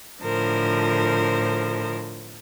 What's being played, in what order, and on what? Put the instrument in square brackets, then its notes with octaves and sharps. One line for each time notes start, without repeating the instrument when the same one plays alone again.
[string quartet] A2 D3 F3 A#4 C5